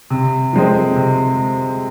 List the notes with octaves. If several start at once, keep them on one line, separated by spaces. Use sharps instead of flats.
C3
F3 G#3 C4
C3